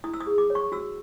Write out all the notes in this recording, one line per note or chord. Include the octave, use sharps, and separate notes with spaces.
E4 D#6
E6
D#6
G#4
D6
C#5
C#6
F#4 E6